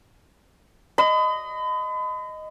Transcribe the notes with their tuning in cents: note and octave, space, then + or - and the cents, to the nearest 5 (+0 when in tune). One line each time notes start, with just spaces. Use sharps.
D#5 +0 B5 +40